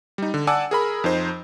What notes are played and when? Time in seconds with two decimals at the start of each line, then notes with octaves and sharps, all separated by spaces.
0.18 G3 D#4
0.34 D3
0.47 D5 F#5 G#5 A5 D6 E6
0.71 G#4 A#4 B5
1.04 F2 D#4 C5